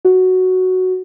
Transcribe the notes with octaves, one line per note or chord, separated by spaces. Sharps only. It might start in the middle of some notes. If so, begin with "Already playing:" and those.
F#4